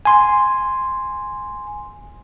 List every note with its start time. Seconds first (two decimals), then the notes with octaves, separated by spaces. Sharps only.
0.05 G#5 C6